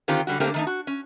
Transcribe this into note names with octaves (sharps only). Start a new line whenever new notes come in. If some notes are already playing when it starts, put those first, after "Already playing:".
D3 D#3 C4 F4 G4
D3 F#3 G3 F#4
D3 A3 A#3 C4 G4 A#4
D#3 A3 D#4
F#4
C#4